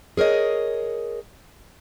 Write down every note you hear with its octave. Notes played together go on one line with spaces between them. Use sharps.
G#4 A#4 C#5 D#5